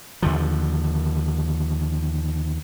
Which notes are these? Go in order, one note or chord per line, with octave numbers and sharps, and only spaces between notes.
D#2 D3 F3